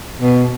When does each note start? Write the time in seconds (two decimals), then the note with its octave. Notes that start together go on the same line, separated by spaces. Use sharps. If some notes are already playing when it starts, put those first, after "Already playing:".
0.19 B2